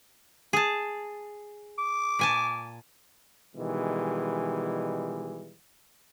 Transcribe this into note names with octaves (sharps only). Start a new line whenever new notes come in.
G#4 A5
D6
A#2 G#5 A5
B2 D#3 E3 G3 G#3